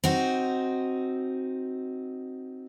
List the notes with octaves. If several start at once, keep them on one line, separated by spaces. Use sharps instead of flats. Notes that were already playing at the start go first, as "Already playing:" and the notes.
C4 D#4 F#4